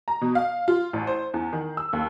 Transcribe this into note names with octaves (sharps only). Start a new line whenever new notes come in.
A#5
B2
F5
F4
A1
C5
E2
D#3
E6
D#2